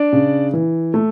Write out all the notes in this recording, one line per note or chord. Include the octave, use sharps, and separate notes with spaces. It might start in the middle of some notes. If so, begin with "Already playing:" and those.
Already playing: D4 D5
C#3
E3
A3